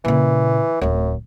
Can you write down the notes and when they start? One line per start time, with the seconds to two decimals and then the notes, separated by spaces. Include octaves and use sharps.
0.05 A#2 C#3 E3
0.81 D1 F#2 A3